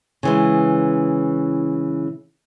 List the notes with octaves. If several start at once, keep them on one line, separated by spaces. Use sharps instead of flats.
C#3 E3 G#3